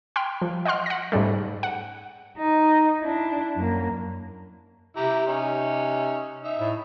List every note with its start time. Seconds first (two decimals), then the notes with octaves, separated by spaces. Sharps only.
0.16 G5 B5 C6 F6
0.42 F3
0.65 D#5 F#5 G5 C6 F6
0.86 F#5 A#6
1.12 G#2 C#3 G3 A3
1.63 F#5
2.38 D#4
3.01 D4 E4
3.56 F#2 A#3
4.96 C3 E4 G4 A#5
5.27 C#4 D#4
6.44 D#4 E5
6.60 A2